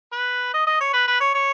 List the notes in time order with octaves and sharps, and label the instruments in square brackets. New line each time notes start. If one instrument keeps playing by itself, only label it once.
[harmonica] B4
D#5
D#5
C#5
B4
B4
C#5
C#5